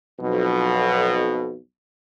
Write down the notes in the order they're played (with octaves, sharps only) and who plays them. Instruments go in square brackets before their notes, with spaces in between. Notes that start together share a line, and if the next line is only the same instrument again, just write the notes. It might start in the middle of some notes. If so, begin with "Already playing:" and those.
[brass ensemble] B1 F2 B2